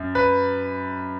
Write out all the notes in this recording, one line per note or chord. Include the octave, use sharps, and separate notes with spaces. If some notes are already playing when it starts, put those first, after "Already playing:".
Already playing: F#2
B4